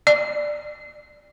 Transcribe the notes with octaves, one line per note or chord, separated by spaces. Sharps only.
D5